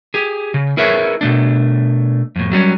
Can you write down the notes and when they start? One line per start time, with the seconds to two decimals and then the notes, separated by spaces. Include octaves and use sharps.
0.14 G4 G#4
0.54 C#3
0.77 E4 G#4 A#4 B4 C#5 E5
1.21 B2 A3 D4
2.36 F2 A2
2.52 F#3 G3 C#4